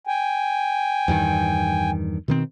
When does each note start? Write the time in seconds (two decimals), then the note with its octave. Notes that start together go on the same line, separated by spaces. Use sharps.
0.07 G5 G#5
1.08 E2 G2 D#3
2.28 B2 D#3 C4